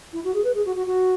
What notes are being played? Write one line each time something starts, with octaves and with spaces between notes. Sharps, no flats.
E4
F#4
G#4
B4
G#4
F#4
F#4
F#4